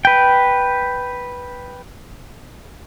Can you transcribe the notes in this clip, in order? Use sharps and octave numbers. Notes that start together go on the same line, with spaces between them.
B4 G5